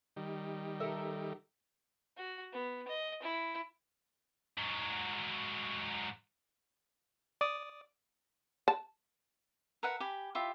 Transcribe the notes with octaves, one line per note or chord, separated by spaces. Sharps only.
D#3 G3
A4 A#4 E5
F#4
B3
D#5
E4
G#2 F#3
D5 D6 D#6
A5
A#4 B4 E5 F#5
G4 G#5 B5
E4 F4 G4 E5